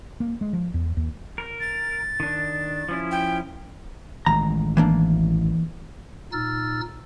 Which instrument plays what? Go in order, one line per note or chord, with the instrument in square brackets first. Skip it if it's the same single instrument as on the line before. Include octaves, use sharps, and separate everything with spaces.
[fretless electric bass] A#3
G#3
F3
E2
D#2
[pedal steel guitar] A#4
[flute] A6
[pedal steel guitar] D#3 D4
F3 C#4 E4
[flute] G5
[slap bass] A1 D#3 G#3 [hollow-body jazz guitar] A#5
[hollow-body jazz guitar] E3 A#3 D4
[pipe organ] A#2 D#4 E6 F6 A6